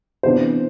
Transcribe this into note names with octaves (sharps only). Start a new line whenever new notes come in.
C3 E3 B3 D4 C5